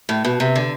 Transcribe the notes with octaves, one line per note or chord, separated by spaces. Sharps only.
A2
B2
C3
D3